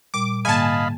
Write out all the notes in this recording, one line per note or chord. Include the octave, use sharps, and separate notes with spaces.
A#2 G3 D6
G#2 D3 A#3 D#5 F5 G#5 A5 B5